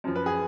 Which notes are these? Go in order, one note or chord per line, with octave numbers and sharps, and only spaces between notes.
F#2 F3
B4
G#4